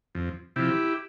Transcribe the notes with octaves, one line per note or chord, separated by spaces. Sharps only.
F2
C3 F3 E4 G4